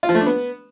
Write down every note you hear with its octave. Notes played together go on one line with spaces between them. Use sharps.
F4
F3
A3
D4
B3